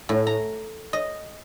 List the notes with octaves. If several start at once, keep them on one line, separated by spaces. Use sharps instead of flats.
A2
A#5
D#5